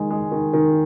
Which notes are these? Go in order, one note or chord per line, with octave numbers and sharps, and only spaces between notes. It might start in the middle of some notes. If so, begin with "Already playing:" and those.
Already playing: D#3 G#3
G#3
D#3
D#3